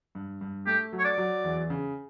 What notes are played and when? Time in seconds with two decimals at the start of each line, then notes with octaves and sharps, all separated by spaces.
0.15 G2
0.41 G2
0.67 A3 G4
0.93 F#3
0.99 C#5
1.05 D5
1.18 F#3
1.44 E2
1.70 C#3